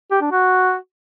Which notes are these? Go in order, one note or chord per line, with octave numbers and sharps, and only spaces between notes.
G4
D4
F#4